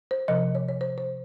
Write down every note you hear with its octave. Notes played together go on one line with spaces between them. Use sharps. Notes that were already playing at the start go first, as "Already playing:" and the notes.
C5
C3 F3 D#5
C#5
C#5
C5
C5